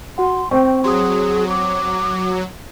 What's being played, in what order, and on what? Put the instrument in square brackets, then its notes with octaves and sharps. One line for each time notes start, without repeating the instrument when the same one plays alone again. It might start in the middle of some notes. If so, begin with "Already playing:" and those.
[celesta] F#4 F#5 [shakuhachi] C6
[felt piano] C4 [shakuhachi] G5 [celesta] C#6
[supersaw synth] F#3 [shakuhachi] G#4 [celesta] C6 D#6
[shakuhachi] D6